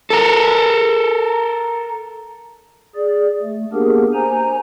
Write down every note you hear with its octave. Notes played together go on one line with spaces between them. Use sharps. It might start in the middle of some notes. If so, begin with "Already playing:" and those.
A4 A#4
G#4 D5
A3
A#3 B3 D4 G4 G#4 A#4
C5 G#5 A#5